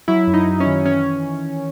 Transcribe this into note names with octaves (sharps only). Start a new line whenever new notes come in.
F#3 E4
F#2
D#4
F#2
C#4
D#3
E3 C#4